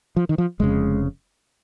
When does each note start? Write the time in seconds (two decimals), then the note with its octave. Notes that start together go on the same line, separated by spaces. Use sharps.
0.16 F3
0.29 D#3
0.38 F3
0.60 F1 F2 C#3 G#3